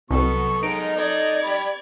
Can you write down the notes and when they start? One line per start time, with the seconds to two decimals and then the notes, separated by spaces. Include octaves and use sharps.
0.11 C2 B2 F#3 B3 A4 C#6
0.63 G#3 B3 D#4 A#4 D7
0.96 A4 D5 D#5 G#6
1.44 G4 B5